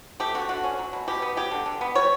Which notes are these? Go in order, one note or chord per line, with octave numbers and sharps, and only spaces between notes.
A3 G4
D3 F#4
D3 F#4
C#4
F#3
B2
B2 G4
B3
F#3 G4
D3
D3
B3
G3 C#5